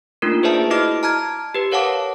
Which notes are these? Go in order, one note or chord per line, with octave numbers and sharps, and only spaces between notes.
A3 A#3 D4 D#4 F4 A#4
G#4 B4 C5 D5 E5 A5
E4 F#4 D#5 D6 F6
A5 A#5 F6 G#6
G4 B4
A#4 C#5 F5 F#5 A5 D6